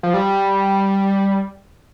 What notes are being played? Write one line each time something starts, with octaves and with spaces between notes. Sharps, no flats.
F3
G3